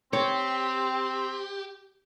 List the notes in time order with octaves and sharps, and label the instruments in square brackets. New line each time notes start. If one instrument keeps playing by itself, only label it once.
[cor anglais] C4 [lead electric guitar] G4 [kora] C#5